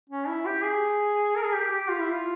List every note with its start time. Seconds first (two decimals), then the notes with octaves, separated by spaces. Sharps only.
0.09 C#4
0.28 E4
0.46 G4
0.63 G#4
1.36 A#4
1.44 G#4
1.54 G4
1.71 G4
1.89 F4
2.00 E4
2.11 F4